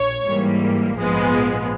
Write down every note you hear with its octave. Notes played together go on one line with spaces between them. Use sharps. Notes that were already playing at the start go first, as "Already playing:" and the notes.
Already playing: A#1 C#5
G#2 E3 G3 A#3
A#1 G#2 F3 G#3 B3